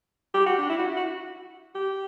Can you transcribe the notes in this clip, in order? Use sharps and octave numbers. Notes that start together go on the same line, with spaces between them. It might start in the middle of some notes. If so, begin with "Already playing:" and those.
G4
F#4
D4
E4
F#4
E4
F#4
G4